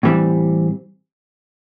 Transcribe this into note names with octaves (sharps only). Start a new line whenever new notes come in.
A2 E3 G3 C4